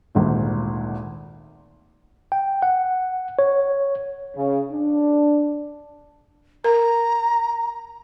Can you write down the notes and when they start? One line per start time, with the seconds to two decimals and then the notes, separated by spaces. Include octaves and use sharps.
0.15 G#1 D2 A#2
2.32 G5
2.62 F#5
3.39 C#5
4.37 C#3
4.71 D4
6.64 A#4 A#5